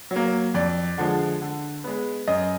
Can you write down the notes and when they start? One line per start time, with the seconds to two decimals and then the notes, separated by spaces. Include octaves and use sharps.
0.11 F#3
0.16 A#3
0.54 F2 D5
0.98 D3 F3 G#3
1.42 D3
1.84 G#3 B3
2.27 F#2 D#5